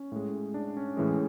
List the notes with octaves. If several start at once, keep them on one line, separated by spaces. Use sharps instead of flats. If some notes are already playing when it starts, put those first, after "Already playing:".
Already playing: C#4
A2 G#3
D4
C#4
A2 E3 G#3 C#4